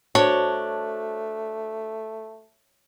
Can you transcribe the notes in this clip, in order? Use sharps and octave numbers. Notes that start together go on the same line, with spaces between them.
A3 D4 F#4 C5 C#5